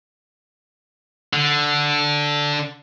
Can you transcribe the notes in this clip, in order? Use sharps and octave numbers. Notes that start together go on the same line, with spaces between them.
D3